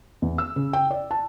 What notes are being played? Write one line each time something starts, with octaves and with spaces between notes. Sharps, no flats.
E2
E6
C#3
G5
D5
A5